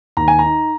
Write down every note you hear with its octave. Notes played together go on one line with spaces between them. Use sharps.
D#2 A#5
G#5
D#4 A#5